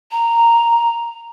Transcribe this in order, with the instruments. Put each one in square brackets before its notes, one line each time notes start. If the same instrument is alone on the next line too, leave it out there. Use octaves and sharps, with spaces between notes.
[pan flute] A#5